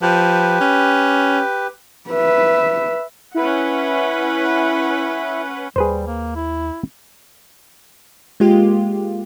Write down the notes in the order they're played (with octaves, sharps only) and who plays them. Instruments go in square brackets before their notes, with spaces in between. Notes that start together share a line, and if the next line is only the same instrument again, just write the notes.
[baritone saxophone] F3 [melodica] G4 B4
[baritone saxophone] C#4
[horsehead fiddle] B4 E5
[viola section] C#4 B4 F#5 [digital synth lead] E4
[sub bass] D#2 [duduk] G3 [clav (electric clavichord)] G#4 B4 C5
[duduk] A#3
E4
[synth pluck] G#3 A#3 F4 G4